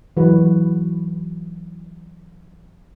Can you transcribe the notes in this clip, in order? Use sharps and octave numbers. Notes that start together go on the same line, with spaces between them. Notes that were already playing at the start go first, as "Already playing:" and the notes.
E3 F#3 F#4 B4